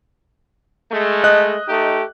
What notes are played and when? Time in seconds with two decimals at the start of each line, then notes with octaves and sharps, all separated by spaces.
0.92 G#3 A3
1.24 D#5 F#6
1.67 A3 D#4 G4